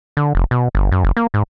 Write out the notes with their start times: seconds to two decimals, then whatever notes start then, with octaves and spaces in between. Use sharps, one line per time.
0.17 D3
0.35 F1
0.51 B2
0.75 G1
0.92 F#2
1.04 F#1
1.17 A#3
1.34 G#2